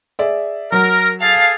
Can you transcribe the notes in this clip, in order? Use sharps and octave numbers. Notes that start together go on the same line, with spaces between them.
G#4 D5 E5
F#3 A#4
G#4 A4 F5 A5